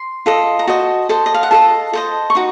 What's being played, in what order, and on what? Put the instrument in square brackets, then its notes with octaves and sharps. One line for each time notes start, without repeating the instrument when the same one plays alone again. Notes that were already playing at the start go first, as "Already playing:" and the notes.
Already playing: [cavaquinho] C6
F4 A4 D#5
A#5
F#4 C5 D#5 A5
A4 C5 D#5
D#5
F5
F#5
F4 A4 D#5 A5
A4 C5 D#5
C#6
D#4 F#4